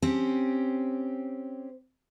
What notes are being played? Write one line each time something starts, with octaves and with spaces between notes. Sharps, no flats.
C4 C#4 G4